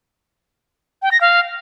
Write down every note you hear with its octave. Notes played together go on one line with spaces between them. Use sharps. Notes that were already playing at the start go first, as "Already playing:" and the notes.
G5
A#6
F5